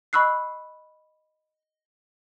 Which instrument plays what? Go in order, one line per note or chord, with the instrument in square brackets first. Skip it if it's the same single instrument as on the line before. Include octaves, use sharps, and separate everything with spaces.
[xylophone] D#5 B5 C#6 E6 F#6 C7